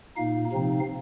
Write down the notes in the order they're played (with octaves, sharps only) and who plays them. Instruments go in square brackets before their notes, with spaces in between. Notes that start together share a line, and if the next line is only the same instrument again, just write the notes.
[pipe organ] A#2 A#3 D#4 F5
C3 F3 C4 D#4